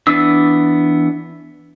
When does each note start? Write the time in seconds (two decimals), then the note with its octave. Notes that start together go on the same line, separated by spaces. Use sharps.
0.07 E3 B3 D4 E6